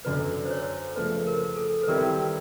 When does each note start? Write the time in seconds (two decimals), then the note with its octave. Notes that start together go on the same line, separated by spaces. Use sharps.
0.05 F#2 D3 F#3 B4
0.45 C5
0.50 C#5
0.96 C#3 F3 A3 B4
1.27 A#4
1.57 A4
1.83 B4
1.88 D#3 G3 C4 E4 G4 A#4